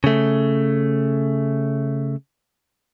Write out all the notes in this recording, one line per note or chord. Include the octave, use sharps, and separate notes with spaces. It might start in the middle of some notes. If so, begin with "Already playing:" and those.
C#3 A3